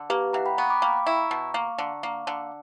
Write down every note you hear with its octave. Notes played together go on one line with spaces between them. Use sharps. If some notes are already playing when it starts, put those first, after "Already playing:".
Already playing: D3
A#3 G4 B4
E3 F#5 A#5
G5 B5
B3 A#5 C#6
B5 D6
A#3 G5 B5
E4 A#5 C#6
B2
A#3
D3
A#3
D3